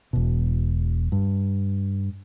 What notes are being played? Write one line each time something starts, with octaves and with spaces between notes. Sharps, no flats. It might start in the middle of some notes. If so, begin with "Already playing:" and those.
E1 B2
G2